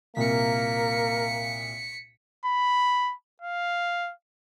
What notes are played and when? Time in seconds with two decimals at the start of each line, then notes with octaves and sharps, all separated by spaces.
0.16 C2 A#2 A#3 A#4 B6 C#7
2.45 B5
3.41 F5